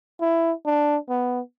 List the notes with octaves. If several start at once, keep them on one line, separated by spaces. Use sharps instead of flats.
E4
D4
B3